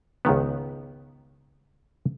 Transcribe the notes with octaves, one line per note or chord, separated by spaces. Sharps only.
C#2 G#2 D#3 B3